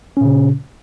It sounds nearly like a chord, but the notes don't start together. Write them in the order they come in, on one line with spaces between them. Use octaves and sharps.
C#4 A#2 C#3